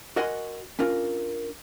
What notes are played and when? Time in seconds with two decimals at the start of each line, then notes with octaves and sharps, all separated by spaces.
0.16 F#4 A#4 D#5 F#5 G#5 C6
0.79 C#4 D4 F4 A#4